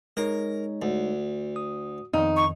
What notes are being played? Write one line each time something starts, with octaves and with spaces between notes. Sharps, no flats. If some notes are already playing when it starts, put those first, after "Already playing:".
G#3 D#4 A#4 C#5
D2
D#6
F2 D#3 D#4
C#6